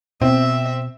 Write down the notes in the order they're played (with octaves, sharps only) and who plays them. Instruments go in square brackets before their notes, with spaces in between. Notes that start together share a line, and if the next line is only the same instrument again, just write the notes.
[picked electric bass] B2 [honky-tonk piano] C4 [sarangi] E5